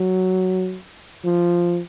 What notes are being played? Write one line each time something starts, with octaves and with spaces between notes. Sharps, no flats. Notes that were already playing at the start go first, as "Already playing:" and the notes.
Already playing: F#3
F3